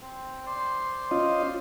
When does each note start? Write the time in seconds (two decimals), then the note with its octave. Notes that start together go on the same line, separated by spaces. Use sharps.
0.01 C4
0.46 C5 D5 C6
1.11 C#4 F4 D#5